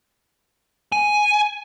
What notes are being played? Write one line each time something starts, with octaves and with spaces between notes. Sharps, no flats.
G#5